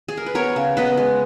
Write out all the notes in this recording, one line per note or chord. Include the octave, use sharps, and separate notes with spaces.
G#4
A#4
B4
B3 A#4 C#5
C#3
B3 B4 D#5
G#3